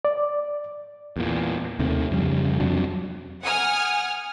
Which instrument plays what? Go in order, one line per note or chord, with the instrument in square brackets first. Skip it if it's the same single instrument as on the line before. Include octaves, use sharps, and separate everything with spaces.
[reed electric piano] D5
[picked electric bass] E2 A#2
D#2 C3 D#3 A3
F2 C#3 G3
F2 C3 F#3 D4
[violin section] F#5 G#5 D#6 F6